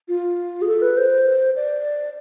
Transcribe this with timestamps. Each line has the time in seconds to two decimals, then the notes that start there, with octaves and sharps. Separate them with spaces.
0.08 F4
0.62 G#4
0.67 A4
0.82 B4
0.97 C5
1.56 D5